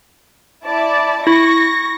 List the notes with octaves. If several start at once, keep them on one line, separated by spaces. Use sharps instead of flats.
E4 D5 A5
E4 C#6 A#6